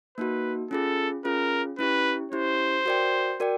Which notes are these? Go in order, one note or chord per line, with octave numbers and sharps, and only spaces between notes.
A#3 D#4 F#4 B4
C#4 F4 G#4 A4
C#4 F4 G#4 A#4
C#4 E4 G4 B4
C#4 E4 G4 C5
F#4 A#4 D5 G5
F#4 A#4 D5 G5